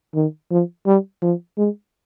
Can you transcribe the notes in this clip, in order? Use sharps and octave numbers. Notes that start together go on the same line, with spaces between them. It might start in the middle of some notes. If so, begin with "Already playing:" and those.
D#3
F3
G3
F3
G#3